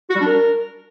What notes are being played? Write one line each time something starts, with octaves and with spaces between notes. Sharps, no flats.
F#4
G3
D4
A#4